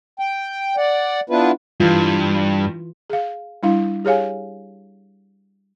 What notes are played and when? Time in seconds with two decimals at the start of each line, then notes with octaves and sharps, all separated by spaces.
0.19 G5
0.77 D5 F#5
1.30 B3 D4 E4 F4 B4
1.80 G2 E3 F4
3.10 G#4 F5
3.63 G3 D4 E4 F5
4.05 G4 G#4 C#5 F5 G#5